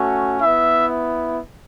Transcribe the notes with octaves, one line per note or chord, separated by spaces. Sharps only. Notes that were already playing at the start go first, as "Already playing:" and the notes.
Already playing: A3 C#4 F#4
B3 E4 E5